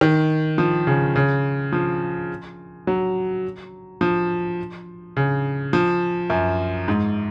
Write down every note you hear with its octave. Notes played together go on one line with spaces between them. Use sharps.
D#3
F3
C#3
C#3
F3
F#3
F3
C#3
F3
F#2
G#2